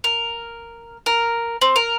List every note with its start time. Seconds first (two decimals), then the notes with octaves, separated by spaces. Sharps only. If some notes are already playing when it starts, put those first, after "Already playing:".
0.04 A#4
1.06 A#4
1.61 C4
1.76 A#4